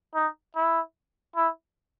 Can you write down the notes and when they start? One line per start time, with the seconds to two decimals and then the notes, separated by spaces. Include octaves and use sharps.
0.15 D#4
0.56 E4
1.36 E4